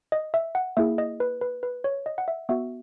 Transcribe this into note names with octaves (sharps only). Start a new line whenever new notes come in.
D#5
E5
F#5
A#3 E4 G#4 E5
D#5
B4
B4
B4
C#5
D#5
F#5
E5
B3 F#4 E5